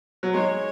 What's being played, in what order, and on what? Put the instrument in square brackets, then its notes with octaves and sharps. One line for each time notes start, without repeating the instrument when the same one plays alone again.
[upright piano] F#3
[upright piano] G#3 [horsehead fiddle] C#5